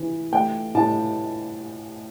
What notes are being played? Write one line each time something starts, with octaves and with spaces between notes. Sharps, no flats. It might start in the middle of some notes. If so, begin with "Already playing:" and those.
Already playing: E3 E4
A3 G5
A2 A5